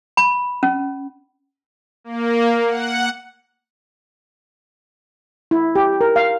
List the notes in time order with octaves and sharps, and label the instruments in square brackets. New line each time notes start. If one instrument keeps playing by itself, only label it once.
[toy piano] B5
C#4
[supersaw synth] A#3
F#5
[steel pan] E4
G4
A#4
F5